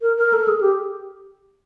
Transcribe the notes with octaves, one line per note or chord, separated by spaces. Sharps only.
A#4
A#4
A4
G#4
G4